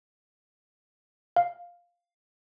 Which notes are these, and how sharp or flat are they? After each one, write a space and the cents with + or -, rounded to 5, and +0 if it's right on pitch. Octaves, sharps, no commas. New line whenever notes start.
F5 +5